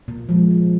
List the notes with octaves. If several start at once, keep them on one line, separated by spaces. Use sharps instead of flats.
A#2
F3 G#3
A#2